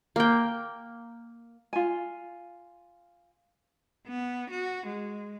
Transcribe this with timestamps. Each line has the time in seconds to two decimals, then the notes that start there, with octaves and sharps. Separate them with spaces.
0.16 A#3 G5
1.73 F4 G#5
4.08 B3
4.51 F#4
4.87 G#3